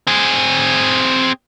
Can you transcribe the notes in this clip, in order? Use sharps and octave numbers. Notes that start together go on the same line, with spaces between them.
C4 G#4